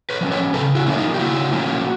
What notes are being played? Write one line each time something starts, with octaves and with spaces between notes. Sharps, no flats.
B4 C#5
F3 A#3 C#4
B4 C#5
C#3 A4 B4
E4 F#4
F3 A#3 C#4 E4
D#4 F4
G4
C#3 E4 F#4
F3 A#3 C#4